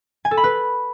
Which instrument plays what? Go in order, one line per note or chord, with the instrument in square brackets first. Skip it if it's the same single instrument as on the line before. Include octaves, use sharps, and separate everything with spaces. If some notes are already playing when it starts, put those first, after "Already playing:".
[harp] G#5
A4
B5
B4